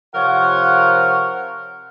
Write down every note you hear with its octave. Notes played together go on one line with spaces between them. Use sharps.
C3 F3 F4 A#4 C#5 F#5